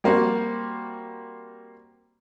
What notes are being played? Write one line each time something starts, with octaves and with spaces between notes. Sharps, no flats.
G3 A#3 C4 F#4